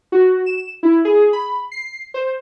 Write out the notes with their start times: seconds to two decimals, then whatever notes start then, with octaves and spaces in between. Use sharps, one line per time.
0.12 F#4
0.46 E7
0.83 E4
1.05 G#4
1.33 B5
1.72 C7
2.14 C5